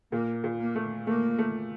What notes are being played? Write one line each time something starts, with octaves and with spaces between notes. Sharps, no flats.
A#2 A#3
A#2
A#3
A3
A3 A#3
A3